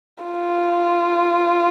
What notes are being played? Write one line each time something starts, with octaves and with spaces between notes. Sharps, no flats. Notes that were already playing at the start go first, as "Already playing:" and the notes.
F4